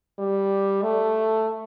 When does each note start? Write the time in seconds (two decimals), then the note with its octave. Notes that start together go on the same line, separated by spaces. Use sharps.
0.19 G3
0.82 A3